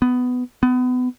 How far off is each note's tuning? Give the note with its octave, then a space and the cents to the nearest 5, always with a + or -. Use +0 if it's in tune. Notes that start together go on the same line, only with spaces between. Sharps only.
B3 +15
B3 +30